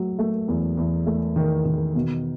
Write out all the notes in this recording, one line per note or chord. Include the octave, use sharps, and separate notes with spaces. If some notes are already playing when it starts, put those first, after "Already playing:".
Already playing: F#3 A3
A3
E2
E2
A3
D#3
D#3
B2